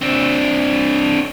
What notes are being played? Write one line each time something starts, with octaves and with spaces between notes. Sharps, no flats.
C4 D4